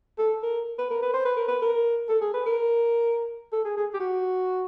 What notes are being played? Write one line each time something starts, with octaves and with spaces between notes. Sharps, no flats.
A4
A#4
B4
A#4
B4
C5
B4
A#4
B4
A#4
A4
G#4
B4
A#4
A4
G#4
G#4
G4
F#4